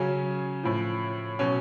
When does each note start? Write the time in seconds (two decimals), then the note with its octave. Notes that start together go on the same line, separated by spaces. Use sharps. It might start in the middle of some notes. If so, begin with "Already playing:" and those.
Already playing: C#3 F#3 C#4
0.63 A2 F3
1.39 B2 F#3 C#4